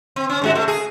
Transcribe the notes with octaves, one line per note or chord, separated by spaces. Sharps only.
C4
C#4
G#2 G#3 F#4
A3
G#4